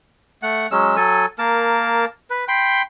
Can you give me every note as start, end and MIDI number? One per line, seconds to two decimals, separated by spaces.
0.42 0.67 57
0.42 0.67 78
0.71 0.96 54
0.71 0.96 56
0.71 0.96 61
0.71 0.96 88
0.97 1.26 54
0.97 1.26 69
0.97 1.26 80
1.39 2.05 58
1.39 2.05 70
1.39 2.05 81
2.30 2.45 71
2.48 2.82 79
2.48 2.82 83
2.48 2.82 84